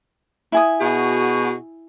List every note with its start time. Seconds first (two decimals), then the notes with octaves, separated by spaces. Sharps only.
0.52 E4 G#5 D#6
0.81 B2 F#4 G#4